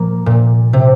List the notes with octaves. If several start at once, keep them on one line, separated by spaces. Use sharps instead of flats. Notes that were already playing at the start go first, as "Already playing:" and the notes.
Already playing: A#2 F3 A#3
A#2
C3